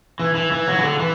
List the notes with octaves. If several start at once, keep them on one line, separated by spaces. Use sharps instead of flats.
E3
E3
E3
F#3
E3
D3
E3